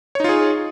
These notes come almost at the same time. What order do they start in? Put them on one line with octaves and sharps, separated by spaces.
C#5 D#4 F4 G#4